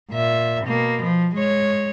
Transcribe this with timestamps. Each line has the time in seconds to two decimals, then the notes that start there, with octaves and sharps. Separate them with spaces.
0.11 A#2 E5
0.65 B2 A#3
1.03 F3
1.35 G#3 C#5